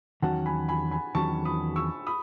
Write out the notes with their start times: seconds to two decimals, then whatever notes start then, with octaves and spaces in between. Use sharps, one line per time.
0.22 E2 D#3 F#3 C#4 F#4 F#5 A5
0.46 G#5 B5
0.68 G#5 B5
0.91 G#5 B5
1.15 E2 D#3 F#3 C#4 F#4 A5 C#6
1.45 B5 D#6
1.76 C#6 E6
2.07 B5 D#6